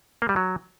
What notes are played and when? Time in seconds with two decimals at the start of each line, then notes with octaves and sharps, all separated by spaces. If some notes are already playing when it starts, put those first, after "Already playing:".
0.22 A#3
0.29 G3
0.36 F#3